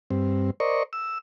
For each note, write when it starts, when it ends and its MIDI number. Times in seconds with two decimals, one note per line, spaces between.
0.11 0.51 43
0.11 0.51 60
0.60 0.83 70
0.60 0.83 72
0.60 0.83 74
0.60 0.83 75
0.60 0.83 85
0.93 1.18 88